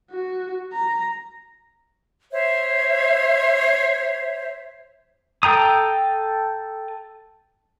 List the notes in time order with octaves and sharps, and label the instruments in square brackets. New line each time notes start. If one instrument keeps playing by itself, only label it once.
[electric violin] F#4
A#5
[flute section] C5 C#5 E5
[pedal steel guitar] A4 G5 A#5 D#6